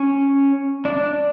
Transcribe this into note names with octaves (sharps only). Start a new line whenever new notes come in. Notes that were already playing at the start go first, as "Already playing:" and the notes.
Already playing: C#4 C#5
D4 D5